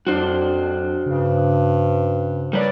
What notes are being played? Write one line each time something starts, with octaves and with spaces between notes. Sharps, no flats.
F2 F#3 D4 F#4 C5
G2 C#3
G3 A#4 B4 C#5 D5